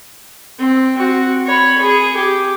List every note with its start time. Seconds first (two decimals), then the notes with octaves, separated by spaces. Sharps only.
0.59 C4
0.97 C4 F#4
1.46 C#5 B5
1.81 G#4
2.16 G4